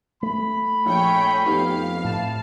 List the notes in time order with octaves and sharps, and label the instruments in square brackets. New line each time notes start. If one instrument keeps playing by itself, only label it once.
[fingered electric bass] A3 [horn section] B5
[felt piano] A#1 [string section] C#5 G5 G#5
[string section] F2 F5 [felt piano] B3 D#4 G4
[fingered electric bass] A2 [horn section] A5